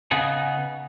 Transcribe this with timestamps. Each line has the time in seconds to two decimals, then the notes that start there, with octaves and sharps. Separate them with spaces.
0.11 C#3 B3 D#4 G#4